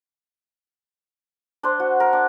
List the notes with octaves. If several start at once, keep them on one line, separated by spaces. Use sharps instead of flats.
D4 C5
F#4
A#4
D4